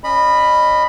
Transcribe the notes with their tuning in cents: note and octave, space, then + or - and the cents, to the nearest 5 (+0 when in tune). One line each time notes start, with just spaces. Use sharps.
C#4 +0 D#5 -25 B5 +0